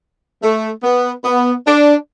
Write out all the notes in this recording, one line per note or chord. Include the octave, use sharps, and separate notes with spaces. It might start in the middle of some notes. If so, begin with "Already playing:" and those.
A3
B3
B3
D4